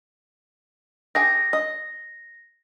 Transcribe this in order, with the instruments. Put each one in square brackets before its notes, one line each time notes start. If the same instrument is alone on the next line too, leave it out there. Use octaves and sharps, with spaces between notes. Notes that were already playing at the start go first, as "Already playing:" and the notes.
[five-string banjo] G4 G#4 G5 [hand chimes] A#6
[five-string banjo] D#5